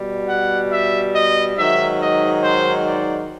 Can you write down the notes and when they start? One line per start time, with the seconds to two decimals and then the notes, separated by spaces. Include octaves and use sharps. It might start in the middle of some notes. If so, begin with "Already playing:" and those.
Already playing: B2 G3
0.29 F#5
0.72 E5
1.15 D#5
1.57 G#2 D#3 F#3 E5
2.01 D#5
2.43 C5
2.86 D5